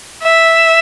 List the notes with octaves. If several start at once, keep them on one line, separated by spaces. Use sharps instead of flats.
E5